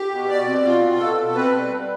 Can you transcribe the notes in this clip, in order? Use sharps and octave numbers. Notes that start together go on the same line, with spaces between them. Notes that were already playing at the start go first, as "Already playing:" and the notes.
Already playing: G4
B2
B2 D5
C4
B2 F4
B2
B2 A4
B2
C4 B4
G3
G3